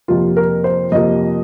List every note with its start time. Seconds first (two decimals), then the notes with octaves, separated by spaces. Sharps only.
0.08 F2 C3 F3 A#3 F4
0.37 A#4
0.64 C5
0.92 F2 C3 F3 A#3 D#5